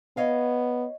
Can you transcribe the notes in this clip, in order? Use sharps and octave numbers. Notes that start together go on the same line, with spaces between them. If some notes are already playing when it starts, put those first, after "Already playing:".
B3 C#5 D#5 F5